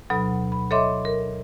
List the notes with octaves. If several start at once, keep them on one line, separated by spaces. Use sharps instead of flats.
D2 B2 F#3 A4 B5
B5
A4 C#5 D#5 E5 C6 D6
A#4